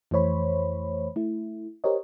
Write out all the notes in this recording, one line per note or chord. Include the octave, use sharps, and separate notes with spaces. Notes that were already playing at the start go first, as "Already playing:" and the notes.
F2 E3 A3 C5 C#5 B5
A3 E4
G4 A#4 C5 C#5 D#5